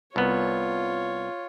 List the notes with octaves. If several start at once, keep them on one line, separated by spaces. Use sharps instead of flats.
C2 B3 F4 C#5